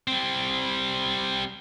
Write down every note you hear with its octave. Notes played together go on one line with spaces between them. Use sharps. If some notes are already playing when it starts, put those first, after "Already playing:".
G3 C4